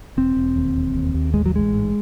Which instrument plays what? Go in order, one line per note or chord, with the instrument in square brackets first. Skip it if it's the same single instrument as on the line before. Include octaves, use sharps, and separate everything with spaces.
[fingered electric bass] E1 C4
E1
D#2
E1
D#2
D#2
A1 G#3
F#3
A1 G#3
G#2